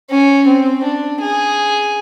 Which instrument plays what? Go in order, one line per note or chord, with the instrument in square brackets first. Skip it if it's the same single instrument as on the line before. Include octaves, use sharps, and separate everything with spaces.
[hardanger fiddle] C#4
C4
D4
G#4